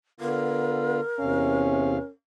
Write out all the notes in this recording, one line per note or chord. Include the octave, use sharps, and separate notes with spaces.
D3 B3 F4 A#4
E2 C3 C#4 F5